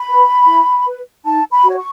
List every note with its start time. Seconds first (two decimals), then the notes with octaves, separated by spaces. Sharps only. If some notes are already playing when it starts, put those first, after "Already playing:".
Already playing: B5
0.08 B4
0.47 E4
0.87 B4
1.25 D#4 A5
1.52 B5
1.64 F#4 C#5
1.77 C#6